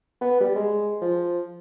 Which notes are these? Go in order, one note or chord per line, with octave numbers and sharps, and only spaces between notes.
B3
G3
G#3
F3